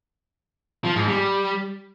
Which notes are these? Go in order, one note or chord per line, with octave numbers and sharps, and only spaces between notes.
F3
G#2
G3